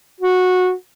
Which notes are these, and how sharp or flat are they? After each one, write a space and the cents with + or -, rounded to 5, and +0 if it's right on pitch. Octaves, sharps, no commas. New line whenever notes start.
F#4 -15